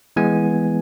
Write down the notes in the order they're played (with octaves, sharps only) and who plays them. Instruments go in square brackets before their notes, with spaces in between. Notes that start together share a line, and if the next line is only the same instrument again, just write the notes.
[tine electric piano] E3 G#3 B3 G#5